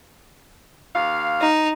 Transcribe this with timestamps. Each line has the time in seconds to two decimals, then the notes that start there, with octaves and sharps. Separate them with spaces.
0.93 D#2 F5
1.40 D#4